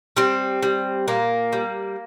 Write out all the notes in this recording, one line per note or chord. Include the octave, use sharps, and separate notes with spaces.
G3 C4
G3
A#2 A#3
G3